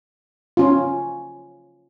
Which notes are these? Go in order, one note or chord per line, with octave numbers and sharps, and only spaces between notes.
C#4 F4